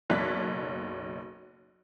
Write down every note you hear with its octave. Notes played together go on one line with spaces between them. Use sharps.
F#1 B1 C#5 D5 F#6 B6